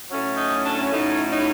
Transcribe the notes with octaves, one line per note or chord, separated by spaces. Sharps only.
A2 F#3 A3 C#4
D#4
D4
A2 F#3 A3 C#4 D#4
D#4